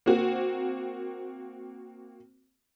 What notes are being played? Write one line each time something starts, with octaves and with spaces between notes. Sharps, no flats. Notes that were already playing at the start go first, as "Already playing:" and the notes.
A#3 C4 F#4